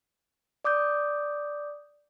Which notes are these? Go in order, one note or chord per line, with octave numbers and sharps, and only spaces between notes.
D5 D6 D#6 G6